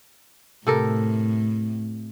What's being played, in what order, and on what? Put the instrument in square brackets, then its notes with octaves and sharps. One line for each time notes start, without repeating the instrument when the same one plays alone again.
[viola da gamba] A2 [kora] C3 A4 A#4